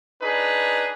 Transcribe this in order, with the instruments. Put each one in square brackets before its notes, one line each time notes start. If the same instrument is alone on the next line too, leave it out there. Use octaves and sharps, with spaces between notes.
[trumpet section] D4 D#4 G#4 B4